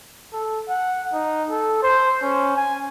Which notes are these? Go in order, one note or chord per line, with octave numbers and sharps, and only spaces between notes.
A4
F#5
D#4
A4
C5
C#4
G#5